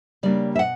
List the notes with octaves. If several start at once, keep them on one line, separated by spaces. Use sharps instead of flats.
C#3 G3 A#3 D4 D5
E5
B2 F#5